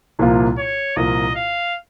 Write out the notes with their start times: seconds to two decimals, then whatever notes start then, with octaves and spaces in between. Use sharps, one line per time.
0.19 C2 A#2 F3 A#3 F4
0.58 C#5
0.96 C2 A#2 F3 A#3 F4 D#5
1.35 F5